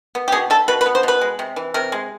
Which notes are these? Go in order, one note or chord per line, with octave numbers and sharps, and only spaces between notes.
B3
G4
B2 G#4
G3 A4
B2 B4
B4
B3
C5
B2 B4
G#3
C3
E3
C3 A#4
G#3